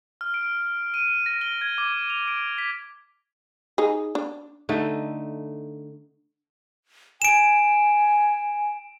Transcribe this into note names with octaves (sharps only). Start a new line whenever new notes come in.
F6
D7
D#7
A#6
G7
G#6
D6
F7
D7
B6
D#4 G#4
D4
D3 A3 D#4
G#5 D7 E7